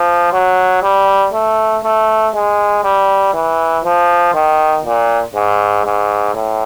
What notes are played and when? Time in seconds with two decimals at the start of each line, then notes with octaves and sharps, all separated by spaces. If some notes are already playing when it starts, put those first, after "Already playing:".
Already playing: F3
0.33 F#3
0.83 G3
1.33 A3
1.84 A3
2.34 G#3
2.84 G3
3.34 E3
3.84 F3
4.34 D#3
4.85 A#2
5.35 G#2
5.85 G#2
6.35 A2